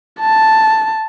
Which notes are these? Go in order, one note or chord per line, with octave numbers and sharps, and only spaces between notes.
A5